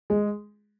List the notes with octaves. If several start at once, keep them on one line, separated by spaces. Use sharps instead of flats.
G#3 G#4